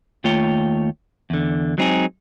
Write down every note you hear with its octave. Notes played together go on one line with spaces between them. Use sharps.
D#2 A3 F4 C#5 G5
E2 D3
F#3 G#3 C4 D#4 F4 G#4